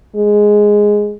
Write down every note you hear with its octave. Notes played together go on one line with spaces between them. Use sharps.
G#3